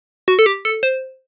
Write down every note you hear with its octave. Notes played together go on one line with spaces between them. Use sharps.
F#4
A4
G4
A4
C5